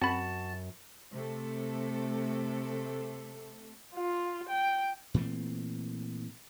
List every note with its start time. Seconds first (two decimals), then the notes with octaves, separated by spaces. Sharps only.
0.02 F#2 C4 F#4 A5 B5
1.13 C3 A3 A4
3.95 F4
4.49 G5
5.14 A#2 E3 A3 C4